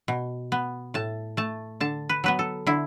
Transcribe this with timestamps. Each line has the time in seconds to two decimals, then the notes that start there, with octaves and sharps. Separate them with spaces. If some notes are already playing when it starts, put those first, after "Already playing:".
0.08 B2
0.52 B3
0.94 A2 A5
1.37 A3 A5
1.80 D3 A5
2.09 B4
2.24 F#3 B3 B4
2.39 A4
2.67 D3 E4